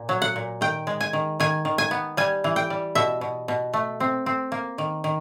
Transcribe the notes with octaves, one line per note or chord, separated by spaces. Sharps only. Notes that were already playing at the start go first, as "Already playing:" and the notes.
Already playing: A#2
F#3
F#5
A#2
D#3 G5
G#3
G#5
D#3
D#3 G#5
D#3
G#5
B3
G3 G#5
E3
G5
G3
B2 E5
B2
B2
A3
C4
C4
A#3
D#3
D#3